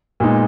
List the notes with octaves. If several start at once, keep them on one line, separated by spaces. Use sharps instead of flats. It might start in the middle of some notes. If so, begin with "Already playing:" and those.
A#2 G#3 B3 D#4